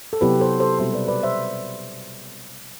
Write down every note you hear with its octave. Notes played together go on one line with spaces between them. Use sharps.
A4
C3 F#3 B3 E4 G4 B4
A4 C5
A4 C5
B2 G3 C4 C5 E5
B4 D5
B4 D5
C5 E5